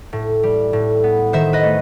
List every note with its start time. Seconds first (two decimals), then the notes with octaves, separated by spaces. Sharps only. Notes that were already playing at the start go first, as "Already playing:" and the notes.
0.13 A2
0.43 G3
0.73 A2
1.04 B3
1.33 D#3 C5 E5
1.53 B4 D#5
1.63 A3